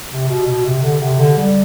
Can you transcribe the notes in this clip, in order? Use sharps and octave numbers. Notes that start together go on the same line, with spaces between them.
C3
B2
B2
C3
D3
C3
D3
G3